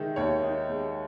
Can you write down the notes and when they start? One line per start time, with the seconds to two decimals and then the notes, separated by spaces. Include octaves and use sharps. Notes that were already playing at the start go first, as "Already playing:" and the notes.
Already playing: D#3 G#3 D#4 E5
0.16 D#2 C#5
0.42 D#4
0.69 G#3